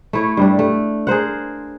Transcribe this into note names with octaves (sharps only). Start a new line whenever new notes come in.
A3 E4 C#5
G2 G3 D4
A3
G#4 A#4 C5 F#5